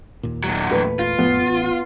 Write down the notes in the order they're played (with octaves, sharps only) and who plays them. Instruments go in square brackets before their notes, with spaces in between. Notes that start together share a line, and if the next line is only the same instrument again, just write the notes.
[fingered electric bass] D#2 A#2
[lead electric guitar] A2 F#3
[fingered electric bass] E2 A#2 A3 [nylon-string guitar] B4
[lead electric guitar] F4
[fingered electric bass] F2 A2 [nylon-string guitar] B3
[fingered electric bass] A1